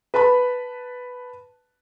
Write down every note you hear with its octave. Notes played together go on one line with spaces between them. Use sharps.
B4 A5 B5